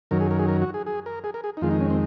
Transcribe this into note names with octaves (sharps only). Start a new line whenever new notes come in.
F#2 D#3 F#3 A#4
G#4
A#4
G#4
A#4
F#4
G#4
G#4
A#4
G#4
A#4
G#4
D#4
F2 D#3 G#3 F4
D#4
C#4
C4